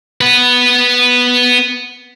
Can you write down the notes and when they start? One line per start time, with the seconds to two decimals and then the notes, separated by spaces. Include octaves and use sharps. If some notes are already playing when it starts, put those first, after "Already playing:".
0.21 B3 B4